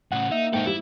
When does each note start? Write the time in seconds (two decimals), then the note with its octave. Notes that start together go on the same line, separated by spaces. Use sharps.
0.12 A2 C#3 F#5
0.32 A#3 D#4 E5
0.53 G#2 D#4 A4 G5
0.66 G3 E4